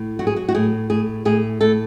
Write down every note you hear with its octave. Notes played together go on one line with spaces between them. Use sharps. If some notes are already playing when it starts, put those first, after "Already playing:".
Already playing: A2
F#3 F#4
G#4
F#4
F#4
A2 G#4
A2 G#4
A2 G#4
A2 A4